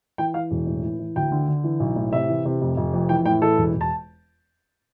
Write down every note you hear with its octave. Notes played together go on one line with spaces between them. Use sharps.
E3 G5
E3 F5
E1
A2
E3
E3
D2 G5
D3
D3
E3
B1
A2
C3 E5
E3
C3
F1
F1
F2
E3 G5
A2 G5
E3 A4
E1
E1
A5